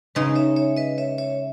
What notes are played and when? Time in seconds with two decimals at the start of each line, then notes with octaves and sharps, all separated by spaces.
0.15 C#3 G#3 D#4 G#4 B4 D#5
0.36 C#5 E5
0.56 C#5 E5
0.76 B4 D#5
0.98 C#5 E5
1.18 C#5 E5